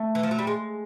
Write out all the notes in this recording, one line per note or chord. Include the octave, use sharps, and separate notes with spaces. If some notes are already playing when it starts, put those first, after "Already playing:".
Already playing: A3
E3
F3
F#3
G3
G#3